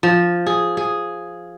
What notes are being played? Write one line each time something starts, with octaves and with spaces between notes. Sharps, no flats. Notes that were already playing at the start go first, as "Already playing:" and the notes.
F3
G#4
G#4